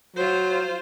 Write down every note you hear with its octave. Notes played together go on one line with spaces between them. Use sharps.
F#3 F4 C5